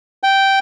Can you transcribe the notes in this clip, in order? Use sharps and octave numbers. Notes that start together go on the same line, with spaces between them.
G5